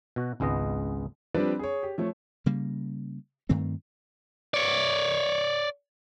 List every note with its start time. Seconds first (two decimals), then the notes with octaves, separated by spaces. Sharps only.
0.16 B2 F#4
0.40 G#1 C#2 G#3 B3 D#5
1.35 F3 G3 C4 D4 B4 D5
1.59 G#4 C#5
1.83 G4
1.98 F3 A3 C#5
2.46 C#3 G3 A#3
3.49 G2 D#3 A3 C4
4.54 C#5 D5